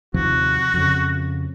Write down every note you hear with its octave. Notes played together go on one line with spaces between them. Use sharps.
D#2 C3 F3 F#4
F2 C#3